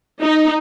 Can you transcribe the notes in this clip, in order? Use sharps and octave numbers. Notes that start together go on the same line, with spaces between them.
D#4